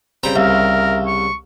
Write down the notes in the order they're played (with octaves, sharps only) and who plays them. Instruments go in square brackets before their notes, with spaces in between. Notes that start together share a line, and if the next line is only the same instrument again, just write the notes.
[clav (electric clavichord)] C#3 G3 C4 [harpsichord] G5 A#5
[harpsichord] C2 [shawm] A#4 [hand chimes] E5 F5 E6
[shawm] C#6